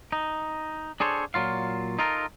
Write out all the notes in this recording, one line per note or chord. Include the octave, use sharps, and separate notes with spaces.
D#4
D4 G#4 A4 C5 C#5
A#2 F#3 F4 F5
D#4 F4 A4 A#4